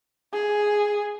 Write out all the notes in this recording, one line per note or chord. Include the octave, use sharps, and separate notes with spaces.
G#4